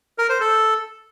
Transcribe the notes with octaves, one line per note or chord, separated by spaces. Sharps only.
A#4
C5
A4